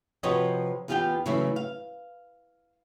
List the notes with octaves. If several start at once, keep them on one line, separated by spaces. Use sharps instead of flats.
C3 F3 F#4 B4 C#5 D#5
E2 B3 F4 G4 F5 G5
C#3 E3 F#3 A3 E4
F5